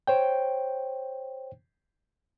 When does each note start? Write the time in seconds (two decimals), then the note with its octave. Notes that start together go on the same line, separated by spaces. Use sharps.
0.07 C5 C#5 G5